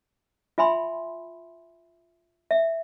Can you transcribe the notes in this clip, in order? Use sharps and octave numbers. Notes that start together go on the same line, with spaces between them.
F4 E5 G#5 B5 C6
E5